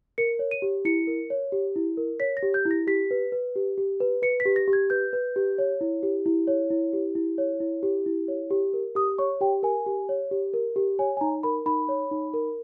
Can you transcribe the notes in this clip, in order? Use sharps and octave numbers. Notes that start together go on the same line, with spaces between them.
A#4 C#7
C#5
D#7
G4
E4 C#7
A#4
C#5
G4
E4
A#4
C#5 B6
A#6
G4
G6
E4
A#6
G4 B6
B4
B4
G4
G4
B4
B4 C#7
B6
G4
A#6
G4
G#6
B4 G6
B4
G4
C#5
E4
G4
E4
C#5
E4
G4
E4
C#5
E4
G4
E4
C#5
G4
A#4
G4 D#6
C#5 C#6
G4 G5
A#4 G#5
G4
C#5
G4
A#4
G4
C#5 G#5
G#5
D#4 A#5
A#4 B5
D#4 B5
C#5
D#4
A#4